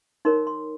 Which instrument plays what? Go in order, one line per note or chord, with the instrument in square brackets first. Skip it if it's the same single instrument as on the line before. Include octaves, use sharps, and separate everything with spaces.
[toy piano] D#4 A#4 C#5 C6
C6